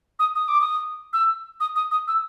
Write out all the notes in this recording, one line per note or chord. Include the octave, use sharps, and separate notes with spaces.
D#6
D#6
D6
D#6
E6
D#6
D#6
D#6
E6